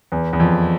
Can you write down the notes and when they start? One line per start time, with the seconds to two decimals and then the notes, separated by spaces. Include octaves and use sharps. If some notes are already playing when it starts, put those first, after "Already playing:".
0.12 E2
0.33 E2
0.40 F2